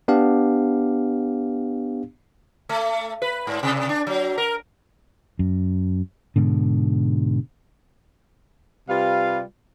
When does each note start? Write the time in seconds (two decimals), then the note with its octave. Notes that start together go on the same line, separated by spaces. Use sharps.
0.08 B3 D4 G4 F5
2.69 A3
3.22 B4
3.47 G#2
3.63 C3
3.89 D4
4.07 F#3
4.38 A#4
5.39 F#2
6.36 G#2 B2 D3
8.89 C3 G3 F4 B4 F5